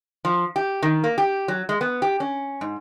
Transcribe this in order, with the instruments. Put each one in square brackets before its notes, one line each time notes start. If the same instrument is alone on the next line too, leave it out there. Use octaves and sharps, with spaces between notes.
[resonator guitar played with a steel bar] F3
G4
D#3
A#3
G4
F#3
G#3
B3
G4
C#4
G#2